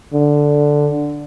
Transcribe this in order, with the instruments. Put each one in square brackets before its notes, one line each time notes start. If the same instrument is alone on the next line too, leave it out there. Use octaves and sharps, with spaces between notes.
[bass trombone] D3